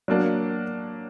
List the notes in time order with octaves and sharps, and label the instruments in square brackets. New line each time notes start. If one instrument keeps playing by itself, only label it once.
[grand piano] F#3 A#3 D4